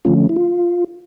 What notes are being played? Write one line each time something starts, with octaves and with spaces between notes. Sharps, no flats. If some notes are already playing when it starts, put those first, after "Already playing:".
D3 F3 A3 C#4 F4
E4
F4